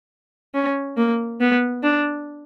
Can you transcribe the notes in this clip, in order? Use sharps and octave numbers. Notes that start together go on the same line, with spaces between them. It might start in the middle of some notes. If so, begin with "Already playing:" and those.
C#4
A#3
B3
D4